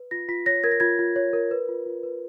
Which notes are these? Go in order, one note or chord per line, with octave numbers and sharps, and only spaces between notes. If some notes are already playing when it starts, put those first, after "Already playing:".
Already playing: B4
F4 A#6
F4 B6
C#5 A#6
A#4 G#6
A#6
F4 G#6
F4
C#5
A#4
B4
F4
F4
B4